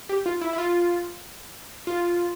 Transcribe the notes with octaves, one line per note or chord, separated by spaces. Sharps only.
G4
F4
E4
E4
F4
F4